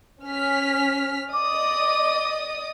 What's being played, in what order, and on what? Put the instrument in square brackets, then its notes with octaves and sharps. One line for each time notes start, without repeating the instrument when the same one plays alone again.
[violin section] C#4 F6 B6
[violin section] D5 D#5 D#6 [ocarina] D6